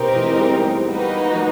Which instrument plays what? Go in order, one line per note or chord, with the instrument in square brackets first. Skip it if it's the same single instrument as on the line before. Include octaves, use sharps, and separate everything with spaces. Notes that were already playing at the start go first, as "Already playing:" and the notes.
Already playing: [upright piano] B2 [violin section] C4 D#4 G4 A#4
[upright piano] E3
G#3
G3
G3
[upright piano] G3 [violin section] A#3 D#4 F#4 B4
[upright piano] F3
F#3